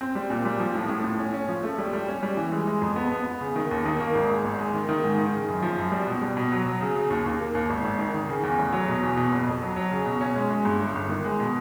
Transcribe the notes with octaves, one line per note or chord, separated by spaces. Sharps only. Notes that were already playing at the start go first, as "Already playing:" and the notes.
C4
G3
A#2
G3
F3
A2
A2
A2
C#4
C#4
F3
A3
G3
G3
C#4
G3
E3
G#3
G#3
F2
B3
B3
B3
C#3
D#3
D#2
D#3
A#3
G#1
G#3
G#1
G#3
D#3
D#3
G#2
D#3
C#3
F#2
F3
F#2
G3
B2
G3
B2
F#3
F#3
C#3
C#3
D#2
D#2
A#3
D#2
G#1
G#1
D#3
D#3
C#3
E2
F1
F#3
B2
E2
B2
F#1
F2
F#3
F#3
C#3
B2
C#4
G#3
G#3
G2
G1
G1
D#3
G#3
B2